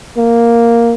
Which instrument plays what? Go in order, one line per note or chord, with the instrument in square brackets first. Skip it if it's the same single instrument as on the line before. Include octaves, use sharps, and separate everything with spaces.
[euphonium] A#3